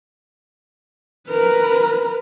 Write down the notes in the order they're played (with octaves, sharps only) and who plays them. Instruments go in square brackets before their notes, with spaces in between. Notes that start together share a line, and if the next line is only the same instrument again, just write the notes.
[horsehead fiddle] A#4 B4